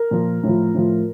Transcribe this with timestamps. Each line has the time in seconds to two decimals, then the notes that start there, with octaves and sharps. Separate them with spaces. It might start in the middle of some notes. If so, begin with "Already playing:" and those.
Already playing: A#4
0.11 A#2 F3
0.43 A2 F3
0.74 A2 F3